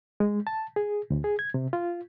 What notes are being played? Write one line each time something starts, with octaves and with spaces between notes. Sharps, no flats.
G#3
A5
G#4
D2
G#4
G#6
C3
F4